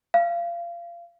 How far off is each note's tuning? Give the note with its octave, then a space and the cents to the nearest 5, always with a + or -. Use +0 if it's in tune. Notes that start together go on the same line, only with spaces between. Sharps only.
F5 -25